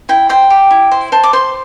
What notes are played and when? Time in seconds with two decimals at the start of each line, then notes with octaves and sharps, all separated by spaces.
0.09 E4 G5
0.29 C5 G5
0.50 G4
0.71 E4
0.92 C5
1.12 C5 A5
1.24 D6
1.33 C5 C6